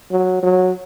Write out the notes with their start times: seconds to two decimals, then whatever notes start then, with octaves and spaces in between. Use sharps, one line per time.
0.11 F#3
0.43 F#3